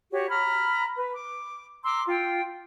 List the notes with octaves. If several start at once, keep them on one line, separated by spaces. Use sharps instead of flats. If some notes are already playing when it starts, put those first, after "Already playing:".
F#4 G4 C#5
A#5 B5 F6
B4
D6
A#5 C6 D6 E6
F4 G5